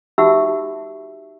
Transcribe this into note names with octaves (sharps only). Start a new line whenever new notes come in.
D#4 F#4 G4 E5 F#5 E6